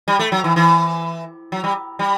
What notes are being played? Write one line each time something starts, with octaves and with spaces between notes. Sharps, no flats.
G3
A3
F#3
E3
E3
F#3
G3
G3